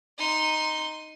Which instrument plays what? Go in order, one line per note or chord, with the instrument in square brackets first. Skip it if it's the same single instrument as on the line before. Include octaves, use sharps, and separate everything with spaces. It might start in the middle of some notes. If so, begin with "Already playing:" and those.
[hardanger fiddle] D#4 C6